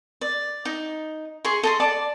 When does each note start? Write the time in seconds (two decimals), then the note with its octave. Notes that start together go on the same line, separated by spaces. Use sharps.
0.21 D5
0.65 D#4
1.45 G#4 C6 C#6
1.63 A4 D#5 C6
1.80 D5 A5 D6